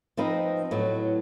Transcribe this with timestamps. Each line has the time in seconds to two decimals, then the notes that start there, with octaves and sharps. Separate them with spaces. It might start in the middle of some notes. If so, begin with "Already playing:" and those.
0.17 F3 C4 D#4 B4 D#5
0.71 A2 F#3 B3